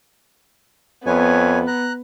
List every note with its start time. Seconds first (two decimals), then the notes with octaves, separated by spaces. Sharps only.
1.06 F2 B3 B4 C#5 G#5
1.67 A#5 F#6